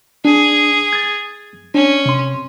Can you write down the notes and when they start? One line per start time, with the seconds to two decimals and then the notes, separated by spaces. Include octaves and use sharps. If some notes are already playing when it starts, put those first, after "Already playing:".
0.25 D4 G#4
0.93 G#6 A6
1.75 C#4 D4
2.06 C3 C6